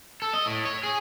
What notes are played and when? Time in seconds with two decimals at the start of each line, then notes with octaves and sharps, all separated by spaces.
0.22 A4
0.33 D#5
0.46 A2
0.65 C#5
0.83 G#4